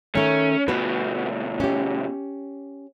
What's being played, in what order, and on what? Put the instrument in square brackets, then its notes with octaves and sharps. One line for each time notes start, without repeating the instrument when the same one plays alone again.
[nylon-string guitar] D#3 A3 [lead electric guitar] C#4
[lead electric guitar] D2 B2 [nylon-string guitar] B3 F#4 B4
[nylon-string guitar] C#4 G4